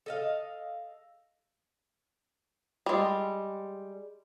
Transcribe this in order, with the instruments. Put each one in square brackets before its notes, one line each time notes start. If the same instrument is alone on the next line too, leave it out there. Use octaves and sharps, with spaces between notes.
[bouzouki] A4 D#5 F5
[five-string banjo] G3 G#3